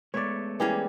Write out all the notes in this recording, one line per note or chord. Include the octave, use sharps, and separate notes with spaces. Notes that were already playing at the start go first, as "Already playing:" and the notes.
G#3 A3 B3 C#5 D5
E3 G3 A#3 C#4 G#4